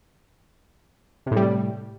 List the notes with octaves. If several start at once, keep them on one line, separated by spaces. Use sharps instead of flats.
A2 C3 G3